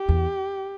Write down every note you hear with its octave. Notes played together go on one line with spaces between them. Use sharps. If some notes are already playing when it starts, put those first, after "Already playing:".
Already playing: G4
E2